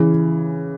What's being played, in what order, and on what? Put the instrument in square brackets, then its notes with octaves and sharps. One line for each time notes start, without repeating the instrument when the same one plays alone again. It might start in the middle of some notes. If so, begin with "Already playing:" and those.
Already playing: [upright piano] C#3 E3